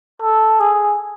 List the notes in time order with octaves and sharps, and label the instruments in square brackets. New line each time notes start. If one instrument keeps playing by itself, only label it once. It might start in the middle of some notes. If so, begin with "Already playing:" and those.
[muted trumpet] A4
G#4